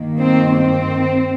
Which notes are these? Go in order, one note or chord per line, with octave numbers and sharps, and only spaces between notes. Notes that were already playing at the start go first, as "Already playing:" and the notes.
Already playing: G2 D#3 A#3
C4
C4